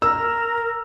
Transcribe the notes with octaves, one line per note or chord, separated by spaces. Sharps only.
A#4 E6